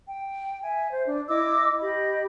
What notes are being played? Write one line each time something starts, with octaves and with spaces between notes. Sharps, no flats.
G5
E5 G#5
C5
D4
E4 D#5 D6 E6
G4 D#5 B5